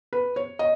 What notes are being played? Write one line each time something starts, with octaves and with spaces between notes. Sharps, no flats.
B4
C#5
D#5